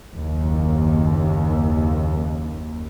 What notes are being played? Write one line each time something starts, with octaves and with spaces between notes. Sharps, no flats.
F#1 D#2